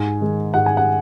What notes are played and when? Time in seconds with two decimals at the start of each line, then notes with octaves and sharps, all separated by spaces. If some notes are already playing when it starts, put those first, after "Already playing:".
Already playing: G#2 G#5
0.21 D#3 G#3
0.54 G#2 F#5
0.66 G#5
0.77 F#5